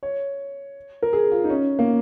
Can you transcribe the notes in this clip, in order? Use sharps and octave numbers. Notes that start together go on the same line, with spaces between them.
C#5
A#4
G#4
F4
D#4
C#4
A#3